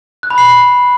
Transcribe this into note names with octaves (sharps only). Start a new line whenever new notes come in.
F#6
B5
C7